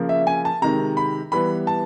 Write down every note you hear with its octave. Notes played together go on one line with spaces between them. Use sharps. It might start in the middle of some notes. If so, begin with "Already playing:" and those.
Already playing: C#3 F3 A#3
E5
G#5
A5
C3 D#3 G#3 A#5
B5
E3 G3 B3 B5
A5